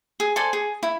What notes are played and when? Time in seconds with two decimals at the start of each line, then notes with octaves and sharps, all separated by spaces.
0.20 G#4
0.36 A4 C5 D5 G#5
0.53 G#4
0.83 E4